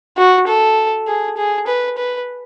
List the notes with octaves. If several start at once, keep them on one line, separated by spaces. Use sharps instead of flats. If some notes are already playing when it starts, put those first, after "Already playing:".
F#4
A4
G#4
G#4
B4
B4